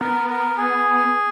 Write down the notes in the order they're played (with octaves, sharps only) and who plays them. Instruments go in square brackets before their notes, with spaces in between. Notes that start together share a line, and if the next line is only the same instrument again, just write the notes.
[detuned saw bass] B3 [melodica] A#4
[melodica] A#4
G#4